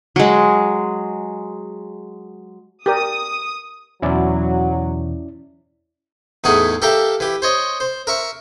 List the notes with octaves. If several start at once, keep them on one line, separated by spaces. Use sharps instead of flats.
F#3 G#3
G4 A#4 D5 D#6
E2 B2 E3 F#3 C#4 E4 D5
E2 A2 E3 D#4 G#4 F#5
G4 A4 A#4 E5 F5 G5
E3 G4
C5 C#5 D#5
C5
A#4 E5 C#6